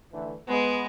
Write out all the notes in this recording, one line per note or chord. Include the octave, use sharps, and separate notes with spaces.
D3 E3 A3
G#3 B3